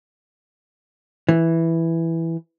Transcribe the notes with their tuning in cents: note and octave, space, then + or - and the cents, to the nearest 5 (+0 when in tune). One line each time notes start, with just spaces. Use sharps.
E3 +0